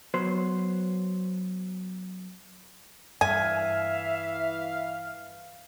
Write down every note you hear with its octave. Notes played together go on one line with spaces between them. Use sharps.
F#3 B3 C5
G2 E3 E5 F5 G#5